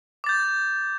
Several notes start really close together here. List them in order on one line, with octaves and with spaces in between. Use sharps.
D6 A6 G6